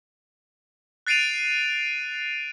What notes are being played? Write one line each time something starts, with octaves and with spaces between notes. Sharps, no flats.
F#6 A6 C7 D7 D#7 F7